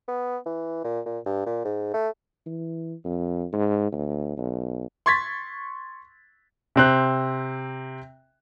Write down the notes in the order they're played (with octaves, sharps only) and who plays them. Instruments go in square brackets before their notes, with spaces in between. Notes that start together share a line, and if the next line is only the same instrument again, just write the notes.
[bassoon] B3
E3
A#2
A#2
G2
A#2
G#2
A3
[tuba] E3
F2
G#2
D2
B1
[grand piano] C6 C#6 G#6 A6 B6
[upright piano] C3 C4 F#6